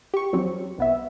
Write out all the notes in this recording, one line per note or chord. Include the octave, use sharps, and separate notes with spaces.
G4 C#6
E2 F#3 C4 C#4
C2 B3 E5